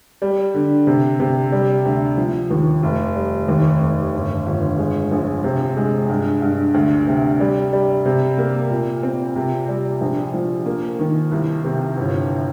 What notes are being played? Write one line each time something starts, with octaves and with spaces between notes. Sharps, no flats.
G3
D3
C3
C3
G3
D2
F3
D#2
F1
G3
D#2
F1
G1
G1
G#3
A#1
C3
G#3
G2
G2
D2
C3
G3
G3
C3
A#3
A#2
C4
C3
G3
A#1
F3
A#3
D#3
C2
C3
G1